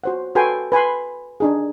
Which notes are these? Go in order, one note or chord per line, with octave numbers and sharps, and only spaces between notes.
F#4 C5 F#5
F#4 A4 B4 G5 G#5 C6
B4 G#5 B5 C6
D4 D#4 G#4